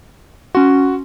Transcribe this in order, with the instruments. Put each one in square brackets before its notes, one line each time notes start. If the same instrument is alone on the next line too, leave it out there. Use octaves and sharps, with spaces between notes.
[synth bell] C#4 C6 [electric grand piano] F#4